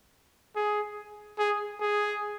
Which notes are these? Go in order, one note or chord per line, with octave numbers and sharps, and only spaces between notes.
G#4
G#4
G#4